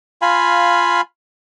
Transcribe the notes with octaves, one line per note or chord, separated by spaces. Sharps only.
F4 F5 G#5 B5